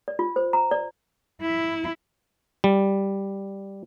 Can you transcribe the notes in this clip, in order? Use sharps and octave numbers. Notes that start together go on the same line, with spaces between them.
D5
F4
C5
A#5
D5
E4
G3